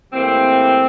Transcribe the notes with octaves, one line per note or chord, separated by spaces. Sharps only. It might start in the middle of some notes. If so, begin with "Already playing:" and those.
A2 E3 G3 A#3 C4